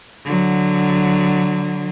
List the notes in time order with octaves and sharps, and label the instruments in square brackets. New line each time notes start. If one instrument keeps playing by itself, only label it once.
[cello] D3 F#3